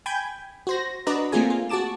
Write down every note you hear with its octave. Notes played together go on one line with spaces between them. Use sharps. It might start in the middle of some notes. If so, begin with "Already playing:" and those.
G5 G#5 B5 G6 G#6
F#4 C5 A#6
D4 F#4 B4 D5 D#5 A#5
A3 A#3 C4 F4 G#4 G#5
F4
F#4 G#4 A5 D6 E7